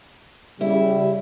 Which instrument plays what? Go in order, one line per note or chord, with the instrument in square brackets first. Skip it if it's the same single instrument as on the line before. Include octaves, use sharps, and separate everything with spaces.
[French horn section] C#3 G3 [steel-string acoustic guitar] E4